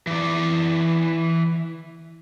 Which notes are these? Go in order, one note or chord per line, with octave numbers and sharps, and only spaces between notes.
E3 D5